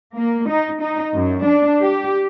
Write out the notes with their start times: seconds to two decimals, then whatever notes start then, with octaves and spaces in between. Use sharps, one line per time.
0.17 A#3
0.50 D#4
0.81 D#4
1.14 F#2
1.44 D4
1.81 G4